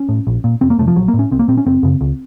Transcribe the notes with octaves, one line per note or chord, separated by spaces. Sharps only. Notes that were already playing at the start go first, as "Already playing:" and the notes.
Already playing: C#4
A2
A#1
A#2
F1 C4
A#3
F2 C3 A3
F3
A#1 F#3
A#3
A2
C#4
C2 C4
A#3
A#2 C4
C#4
F#1 C4
F#2 C#3
C#2